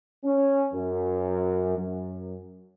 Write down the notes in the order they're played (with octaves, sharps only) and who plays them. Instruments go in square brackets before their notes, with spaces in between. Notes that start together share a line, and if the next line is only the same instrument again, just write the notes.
[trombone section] C#4
F#2
F#2